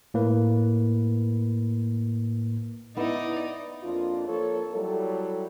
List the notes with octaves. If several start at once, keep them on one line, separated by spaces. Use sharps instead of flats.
A2 A#3 B4
B3 D#4 E4 D5
F2 A#3 D4 F4
F3 A#3 A4 C#5
F#3 G3 E4 A4